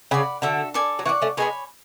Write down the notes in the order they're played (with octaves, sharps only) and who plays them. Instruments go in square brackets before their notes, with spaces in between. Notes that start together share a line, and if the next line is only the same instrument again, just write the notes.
[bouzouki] C#3 [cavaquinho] D5 F#5 B5
[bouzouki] D3 [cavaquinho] F#4 A4 E5
[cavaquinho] A4 D5 G#5
[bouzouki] F#3
[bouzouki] E3 [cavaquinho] D5 F#5 C#6
[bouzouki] A3 C#4
[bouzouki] G#3 B3 [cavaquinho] C#5 G#5 B5